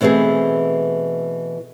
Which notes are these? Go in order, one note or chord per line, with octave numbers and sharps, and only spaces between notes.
B2 E3 A3 C4 G#4